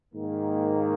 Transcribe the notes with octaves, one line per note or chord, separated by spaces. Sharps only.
G#2 D#3 A#3